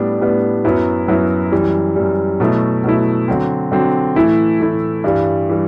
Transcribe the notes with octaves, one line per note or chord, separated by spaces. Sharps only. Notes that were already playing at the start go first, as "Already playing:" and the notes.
Already playing: A2 G3 B3 D4
A2 G3 B3 D4
F#2 F#3 B3 E4
F#2 F#3 B3 E4
F#2 E3 G3
F#2 E3 G3
B2 F#3 A3 E4
B2 F#3 A3 E4
D3 F#3 C4
D3 F#3 C4
A2 E3 A3 E4
A2 E3 A3 E4
G2 E3 G3
E3 G3